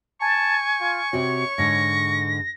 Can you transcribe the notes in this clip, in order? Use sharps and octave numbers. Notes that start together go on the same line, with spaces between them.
G#5 A5 C#6
F4
C3 C4 F#4 C#5
G#2 D3 G#3 A#6